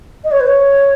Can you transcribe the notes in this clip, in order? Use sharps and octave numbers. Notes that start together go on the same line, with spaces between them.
D#5
C#5
B4
C#5